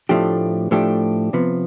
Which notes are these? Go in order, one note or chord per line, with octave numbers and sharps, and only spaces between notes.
A2 F3 A3 D4 G4
A2 F3 A3 D4 G4
C3 F3 B3